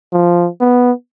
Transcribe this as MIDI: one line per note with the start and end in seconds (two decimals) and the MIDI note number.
0.13 0.48 53
0.61 0.92 59